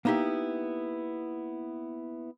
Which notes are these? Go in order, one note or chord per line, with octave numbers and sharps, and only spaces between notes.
A#3 B3 D#4 E4 G4